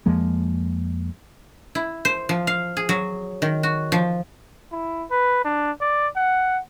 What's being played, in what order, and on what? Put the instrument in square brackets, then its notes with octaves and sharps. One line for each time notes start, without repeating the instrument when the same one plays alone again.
[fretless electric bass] F2 F3 G#3 A#3
[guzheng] E4
C5
F3
F5
G#4
F#3
D#3
F#4
F3
[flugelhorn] E4
B4
D4
D5
F#5